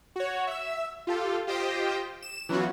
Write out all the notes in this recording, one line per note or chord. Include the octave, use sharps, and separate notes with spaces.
F#4 C#5
E5 E6
F4 G4 A4
F4 G4 C5 D#5 G5
E7
E3 F#3 B3 C#4 F4 F#4